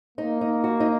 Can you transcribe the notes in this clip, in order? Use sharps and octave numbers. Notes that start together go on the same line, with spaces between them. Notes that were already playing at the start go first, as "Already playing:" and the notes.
A#3 D#4
D#4
F#4
D#4